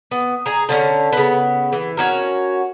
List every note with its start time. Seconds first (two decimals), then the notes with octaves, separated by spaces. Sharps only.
0.11 B3
0.46 G#4 A#5
0.69 D3 C4 C#4
1.12 C#3 B3
1.72 E3
1.97 C#4 F#4 A#4